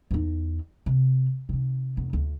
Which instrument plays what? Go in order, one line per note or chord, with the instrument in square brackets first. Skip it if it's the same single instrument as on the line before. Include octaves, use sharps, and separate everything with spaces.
[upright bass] E2 D#4
C3
C3 D#3
F1
D2